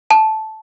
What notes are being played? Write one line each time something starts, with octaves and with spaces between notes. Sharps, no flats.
A5